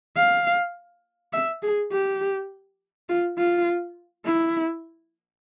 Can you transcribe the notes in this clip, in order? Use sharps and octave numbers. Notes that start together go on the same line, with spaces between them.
F5
E5
G#4
G4
F4
F4
E4